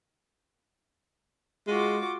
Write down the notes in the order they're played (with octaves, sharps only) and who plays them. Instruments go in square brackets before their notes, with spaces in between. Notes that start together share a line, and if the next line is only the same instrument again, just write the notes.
[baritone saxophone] G#3 [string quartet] F4 F#4 D6